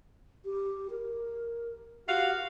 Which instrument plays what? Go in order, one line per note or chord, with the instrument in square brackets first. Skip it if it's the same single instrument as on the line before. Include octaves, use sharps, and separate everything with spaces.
[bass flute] G4
A#4
[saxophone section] F#4 F5 [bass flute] G4